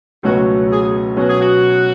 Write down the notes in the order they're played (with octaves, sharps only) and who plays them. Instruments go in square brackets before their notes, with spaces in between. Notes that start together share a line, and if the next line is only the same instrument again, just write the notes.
[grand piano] C#2 B2 F#3 A3 C#4 [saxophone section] F#4
[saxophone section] G#4
[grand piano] B2 F#3 C#4 [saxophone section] F#4
[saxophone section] G#4
F#4